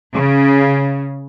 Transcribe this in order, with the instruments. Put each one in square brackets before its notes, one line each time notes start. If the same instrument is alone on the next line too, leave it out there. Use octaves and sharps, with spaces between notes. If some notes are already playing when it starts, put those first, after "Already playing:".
[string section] C#3